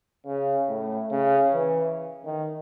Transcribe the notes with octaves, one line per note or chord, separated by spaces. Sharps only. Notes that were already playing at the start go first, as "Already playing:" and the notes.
C#3
A2
C#3
E3
D#3